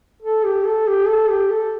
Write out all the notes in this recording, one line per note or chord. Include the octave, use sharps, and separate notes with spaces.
A4
G4
A4
G4
A4
G4
A4